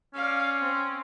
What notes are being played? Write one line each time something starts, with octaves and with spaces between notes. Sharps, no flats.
C#4 D5 F5
C4